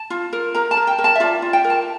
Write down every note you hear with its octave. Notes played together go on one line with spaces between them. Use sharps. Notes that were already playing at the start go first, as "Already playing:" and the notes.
Already playing: A5
F4
A#4
A#4 A#5
A5
A#4
G5
A#4
A5
E5
F4 D5
F4
G5
A#4
A5